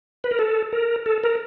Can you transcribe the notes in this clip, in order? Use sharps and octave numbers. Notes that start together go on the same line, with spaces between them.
B4
A#4
A4
A#4
A4
A#4